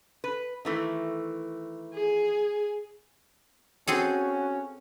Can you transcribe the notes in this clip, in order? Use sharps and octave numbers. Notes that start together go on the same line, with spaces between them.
B4
D#3 E3 A3
G#4
C4 C#4 F#4 G#4 A4